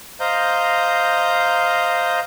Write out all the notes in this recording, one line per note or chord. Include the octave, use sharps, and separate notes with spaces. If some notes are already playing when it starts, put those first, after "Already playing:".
C5 D#5 F5 A#5 G6